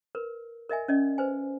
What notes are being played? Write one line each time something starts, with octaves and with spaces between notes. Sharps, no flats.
A#4 B4
A#4 D#5 E5 G#5
C#4 D5 D#5
B4 C5 G#5